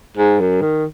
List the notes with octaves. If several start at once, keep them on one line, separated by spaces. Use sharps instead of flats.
G#2
F#2
D#3